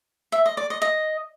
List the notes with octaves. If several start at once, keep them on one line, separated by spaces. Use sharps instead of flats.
E5
D#5
D5
D#5
D#5